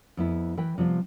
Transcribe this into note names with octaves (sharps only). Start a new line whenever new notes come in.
F2 B3 E4
E3 B4 G5
C3 F3 G3 B3